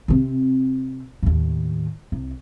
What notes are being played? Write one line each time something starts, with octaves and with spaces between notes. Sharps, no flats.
C3 C4
D#2 A2
C2